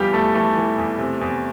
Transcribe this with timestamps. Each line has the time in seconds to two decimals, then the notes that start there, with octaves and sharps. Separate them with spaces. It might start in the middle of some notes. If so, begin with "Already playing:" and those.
Already playing: E2 E3 G3 F4 G4
0.13 E2 A3 A4
0.34 E3 A3 A4
0.57 E3
0.78 E2
0.99 C3
1.21 E2